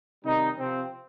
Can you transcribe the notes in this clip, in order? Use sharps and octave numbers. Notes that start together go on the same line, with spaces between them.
C3 D#3 G3 D#4
C3 F3 C4